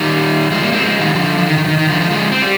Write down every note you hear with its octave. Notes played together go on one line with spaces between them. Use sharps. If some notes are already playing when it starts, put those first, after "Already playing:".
Already playing: D#3 G3
F3 G#3
G3 A#3
G#3 C4
F3 G#3
D#3 G3
D3 F3
F3
D#3
D#3
F3
D#3
D#3
D3 F3
D3 F3
F3 G#3
C4
G3